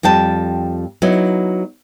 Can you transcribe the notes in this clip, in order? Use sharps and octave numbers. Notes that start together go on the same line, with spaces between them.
F2 G3 G5 A5
F#3 B3 D#4 E4